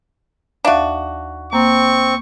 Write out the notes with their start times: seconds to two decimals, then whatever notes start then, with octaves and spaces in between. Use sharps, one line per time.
0.65 D#2 D4 F#4 E5 F5
1.53 A#3 C4 C#6